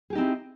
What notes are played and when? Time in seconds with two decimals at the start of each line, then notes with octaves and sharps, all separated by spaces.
0.10 G#4
0.13 G4
0.15 D#4
0.18 C4
0.21 E4